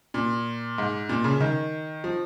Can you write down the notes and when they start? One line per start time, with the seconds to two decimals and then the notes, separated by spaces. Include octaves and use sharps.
0.14 A#2
0.78 G#2
1.09 A#2
1.24 C#3
1.40 D#3
2.04 F3